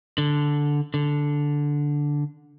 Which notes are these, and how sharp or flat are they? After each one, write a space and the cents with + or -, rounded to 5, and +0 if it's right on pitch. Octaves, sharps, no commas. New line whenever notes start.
D3 -5
D3 -5